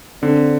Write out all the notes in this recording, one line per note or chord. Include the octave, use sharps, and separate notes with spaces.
D3 C4 D4